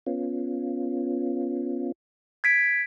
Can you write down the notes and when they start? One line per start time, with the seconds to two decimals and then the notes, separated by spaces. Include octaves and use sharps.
0.07 B3 C#4 F4
2.44 G#6 B6 D7